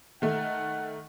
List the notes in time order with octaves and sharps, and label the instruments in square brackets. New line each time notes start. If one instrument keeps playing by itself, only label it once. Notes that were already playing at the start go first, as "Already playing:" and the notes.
[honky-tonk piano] D#3 A3 [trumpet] F#5